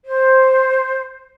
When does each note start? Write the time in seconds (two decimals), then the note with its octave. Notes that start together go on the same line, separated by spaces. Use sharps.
0.05 C5